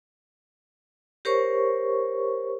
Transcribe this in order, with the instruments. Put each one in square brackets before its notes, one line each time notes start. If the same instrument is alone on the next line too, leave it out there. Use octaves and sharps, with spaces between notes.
[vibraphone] G4 A#4 C5 C#5 C#6